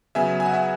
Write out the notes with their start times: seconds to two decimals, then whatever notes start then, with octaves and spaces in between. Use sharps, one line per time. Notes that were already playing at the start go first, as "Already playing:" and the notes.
0.15 C#3 F#3 B3 E5 G#5
0.40 G#5
0.46 F#5
0.53 E5 G#5